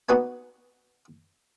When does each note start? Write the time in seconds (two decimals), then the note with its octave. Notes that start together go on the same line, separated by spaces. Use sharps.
0.09 B3 D#4 F#4 B4 D5 G#5